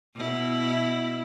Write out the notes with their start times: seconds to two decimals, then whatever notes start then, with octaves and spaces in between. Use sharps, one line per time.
0.15 B2 E4